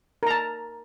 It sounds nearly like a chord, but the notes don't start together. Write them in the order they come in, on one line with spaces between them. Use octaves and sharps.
A#4 A#5 A5